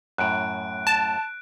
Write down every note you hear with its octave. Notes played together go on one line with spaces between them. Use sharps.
F#2 A2 F#6 D7
A5